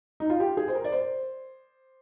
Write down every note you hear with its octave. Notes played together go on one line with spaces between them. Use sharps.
D#4
F4
G4
G#4
C5
A#4
D5
C5